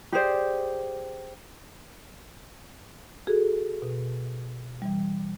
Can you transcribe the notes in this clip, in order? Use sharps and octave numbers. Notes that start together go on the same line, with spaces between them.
G4 G#4 C5 D5
F#4 G#4 A4
B2
E3 G3